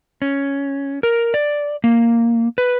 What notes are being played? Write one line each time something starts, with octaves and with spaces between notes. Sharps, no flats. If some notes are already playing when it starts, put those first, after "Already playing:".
C#4
A#4
D5
A#3
B4